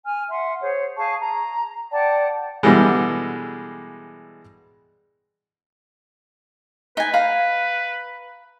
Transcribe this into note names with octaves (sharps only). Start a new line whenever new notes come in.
G#5 F6
E5 F#5 C6
G#4 C5 C#5
G#4 F5 A5 C#6
A#5
D5 F#5 G5 A5
B2 D3 E3 G3 G#3
D#4 B4 G#5
F5 A#5 B5